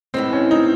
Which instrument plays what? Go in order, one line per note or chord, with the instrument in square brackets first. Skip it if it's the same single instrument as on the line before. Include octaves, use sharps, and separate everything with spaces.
[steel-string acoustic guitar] A2 E3 G#3 [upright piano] C4
[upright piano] C#4
D#4